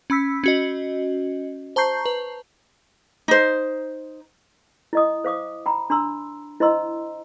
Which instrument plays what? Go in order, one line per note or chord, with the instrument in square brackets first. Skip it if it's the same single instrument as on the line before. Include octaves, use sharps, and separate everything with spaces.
[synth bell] C#4 B5 E6 B6
C#4 F#4 D#5
C5 A5 A#5 C#6 G6 C7
B4
[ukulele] D#4 C5
[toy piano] E4 D#5 D#6
C5 F5 D6 D#6
G5 A#5 B5
D4 A#5 C6 E6
E4 C5 D#5 A#5 C6 E6